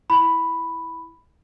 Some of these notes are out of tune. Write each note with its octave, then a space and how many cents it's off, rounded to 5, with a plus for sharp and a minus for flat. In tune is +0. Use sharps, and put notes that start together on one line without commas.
E4 +0 B5 +0